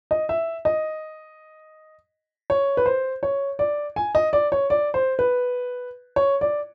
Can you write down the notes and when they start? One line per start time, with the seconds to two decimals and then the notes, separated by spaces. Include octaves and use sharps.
0.11 D#5
0.29 E5
0.65 D#5
2.50 C#5
2.77 B4
2.86 C5
3.23 C#5
3.59 D5
3.96 G#5
4.15 D#5
4.33 D5
4.52 C#5
4.70 D5
4.94 C5
5.19 B4
6.16 C#5
6.41 D5